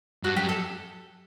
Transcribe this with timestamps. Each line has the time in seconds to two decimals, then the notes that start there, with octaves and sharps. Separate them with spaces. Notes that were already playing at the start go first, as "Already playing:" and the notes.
0.23 G2 F#4
0.36 F#2 G4
0.49 A4